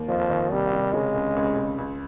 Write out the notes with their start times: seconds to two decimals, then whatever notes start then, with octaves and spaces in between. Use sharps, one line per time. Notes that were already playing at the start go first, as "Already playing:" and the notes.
Already playing: D#2
0.08 F2 F3
0.29 D#3
0.51 C3 G3
0.72 C3
0.93 C#3 G#3
1.15 C#2
1.36 C#2
1.57 C#2
1.78 C#2